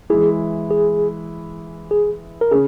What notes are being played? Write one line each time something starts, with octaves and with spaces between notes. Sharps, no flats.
E3 G#3 E4 G#4
G#4
G#4
A#4
C#3 G#4